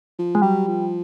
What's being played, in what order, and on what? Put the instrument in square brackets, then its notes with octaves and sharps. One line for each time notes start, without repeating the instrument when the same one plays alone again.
[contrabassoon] F3
[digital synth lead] G#3
[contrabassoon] F#3 [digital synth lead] G3
[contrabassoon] F3